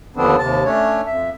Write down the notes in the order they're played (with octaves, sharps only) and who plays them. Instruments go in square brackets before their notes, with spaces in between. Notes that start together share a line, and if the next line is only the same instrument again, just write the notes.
[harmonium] D#2 D3 F3 B3 C4 D4
D#2 C3 A5
A3 C#4 D4 C#5
F2 E5